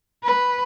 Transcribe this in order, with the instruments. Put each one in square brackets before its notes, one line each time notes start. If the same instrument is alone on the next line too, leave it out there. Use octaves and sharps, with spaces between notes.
[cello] B4